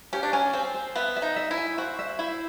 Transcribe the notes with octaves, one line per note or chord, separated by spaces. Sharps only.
C#4 G4
D4
C#4 G#5
C4 C5
C5
B3 E5
E5
D#4
E5
E4
G#5
F#4 C5
E5
E4 C5